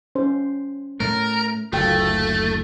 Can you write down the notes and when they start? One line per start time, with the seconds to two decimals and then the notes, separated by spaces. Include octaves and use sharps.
0.15 C#4 C5
1.00 A2 A3 A#4
1.72 F#1 D2 A3 F4 G5